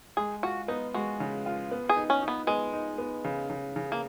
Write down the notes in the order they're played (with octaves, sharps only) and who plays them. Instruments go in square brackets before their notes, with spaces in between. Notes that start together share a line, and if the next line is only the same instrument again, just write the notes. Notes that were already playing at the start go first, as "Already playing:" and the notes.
[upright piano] G#3 [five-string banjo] G#4
[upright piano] F4 [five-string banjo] F#4
[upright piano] B3 [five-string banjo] D#4
[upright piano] G#3 [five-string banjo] F#4
[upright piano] C#3
F4
B3
[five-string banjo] G#4
[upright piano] D#4
[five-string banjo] C#4
[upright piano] D#4
[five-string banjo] B3
[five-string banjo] G#3 [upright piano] B3
[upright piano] D#4
B3
C#3
C#3
C#3
[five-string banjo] A#3